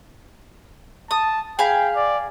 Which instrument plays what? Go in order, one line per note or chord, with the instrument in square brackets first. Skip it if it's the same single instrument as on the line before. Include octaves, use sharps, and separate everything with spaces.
[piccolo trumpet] A5 [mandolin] D#6
[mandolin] G#4 F5 B5 [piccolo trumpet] G5
[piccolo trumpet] D5